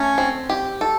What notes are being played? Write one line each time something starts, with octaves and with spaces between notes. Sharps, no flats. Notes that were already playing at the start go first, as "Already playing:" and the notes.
Already playing: A3 C#4 C#5
C4
G4
A4